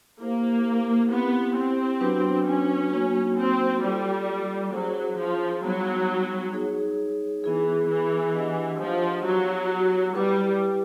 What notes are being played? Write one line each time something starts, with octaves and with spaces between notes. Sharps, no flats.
A#3 E4 G4 C5 F5
B3 C4 E4 G4
C4
F#3 B3 D4 F#4 B4
C#4
F#3 A#3 D#4 F#4
C4
G3 F4 A4 D5
F#3 C#4 E4 G#4 C5
F3
F#3 G3 B3 D#4
D#4 G#4 C#5
E3 B3 E4 G#4
E3
D4 G4 B4 D#5 F#5
F3
F#3 B3 E4 G4
G3 E4 G4 B4